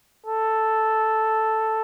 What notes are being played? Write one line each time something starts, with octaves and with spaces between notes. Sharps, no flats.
A4